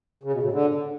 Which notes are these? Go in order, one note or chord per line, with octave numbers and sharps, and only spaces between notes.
C#3
B2
A2
D3